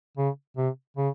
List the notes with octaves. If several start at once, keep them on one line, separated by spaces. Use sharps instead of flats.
C#3
C3
C#3